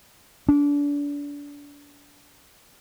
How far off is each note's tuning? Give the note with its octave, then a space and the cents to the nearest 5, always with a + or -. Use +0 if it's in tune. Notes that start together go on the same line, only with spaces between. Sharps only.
D4 -30